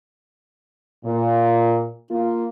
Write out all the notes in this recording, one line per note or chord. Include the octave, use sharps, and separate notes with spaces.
A#2
A#3 F4